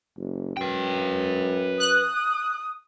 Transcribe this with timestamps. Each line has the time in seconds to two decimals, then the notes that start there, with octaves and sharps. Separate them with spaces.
0.17 F#1
0.57 F#2 B4 G5
1.80 D#6 F#6